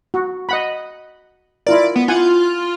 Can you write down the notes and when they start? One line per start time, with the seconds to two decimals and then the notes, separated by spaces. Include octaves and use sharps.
0.14 F#4
0.49 D#5 F#5 B5
1.66 E4 F4 A#4 D5
1.96 B3
2.08 E4 F4 F#5 G#5